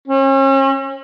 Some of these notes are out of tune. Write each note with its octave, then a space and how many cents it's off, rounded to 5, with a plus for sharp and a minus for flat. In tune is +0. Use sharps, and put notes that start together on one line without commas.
C#4 -40